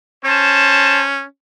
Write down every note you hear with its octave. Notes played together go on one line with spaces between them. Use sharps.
C#4 C5 A5